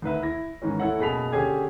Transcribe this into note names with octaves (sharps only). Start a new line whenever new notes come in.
D2 D#3 B4 E5
E4 A#6
G#2 D#3 E3 C#4
A3 E4 A4 C#5 F#5
F#1 B2 G#4 B5 B6 F7
D3 C#4 G4 G#4 G#5 G#6